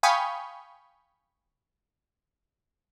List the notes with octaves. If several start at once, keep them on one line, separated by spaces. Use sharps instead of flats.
F5 G5 G#5 B5 C#6 D#6